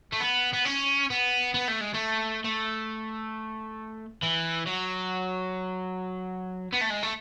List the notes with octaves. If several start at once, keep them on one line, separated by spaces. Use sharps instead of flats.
A3
B3
B3
C#4
B3
B3
A3
G#3
A3
A3
E3
F#3
B3
A3
G#3
A3